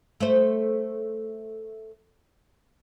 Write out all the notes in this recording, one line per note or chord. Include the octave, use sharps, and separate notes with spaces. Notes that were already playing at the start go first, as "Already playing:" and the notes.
A3 C5